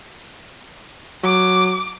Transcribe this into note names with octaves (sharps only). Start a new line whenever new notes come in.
F#3 D6